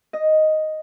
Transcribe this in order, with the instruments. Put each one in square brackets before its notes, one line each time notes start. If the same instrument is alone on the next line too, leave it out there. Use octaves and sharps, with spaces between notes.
[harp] D#5